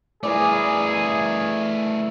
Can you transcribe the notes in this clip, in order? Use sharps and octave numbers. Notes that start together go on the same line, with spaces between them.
E3 A3 G#4 A#4 D5